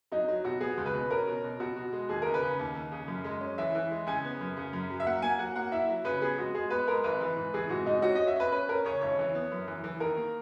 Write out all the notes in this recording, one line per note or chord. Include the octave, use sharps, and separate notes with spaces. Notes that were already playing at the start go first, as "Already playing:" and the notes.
F#3 D#4
F#3
B2 F#4
B3 G#4
C#2
B4
B2
C#4 A#4
B2
B2
B2 F#4
B2
G#3
D#2 G#4
C#3 A#4
B4
C#3
D#2
D#2
C#3
F#2
G#3
C#4
E3 E5
E3
G#3
C#3 G#5
B3
F#2
C#3
F#2
F#3
E5
A#3 F#5
A#3 G#5
F#3 F#5
A#3 F#5
E4 E5
F#3
C#3 B4
B3 G#4
G#3 F#4
G#3 G#4
B3 B4
G#3 A#4
G#1 B4
E3
G#2
E3 G#4
G#2 F#4
G#2 D#4
C#4 F#4
C#4 D#5
E5
C#4 B4
C#4 B4
C#4 A#4
C#3 C#5
G#1 C#5
E3
B3
F#2
E3
E3
D#3 A#4
A#3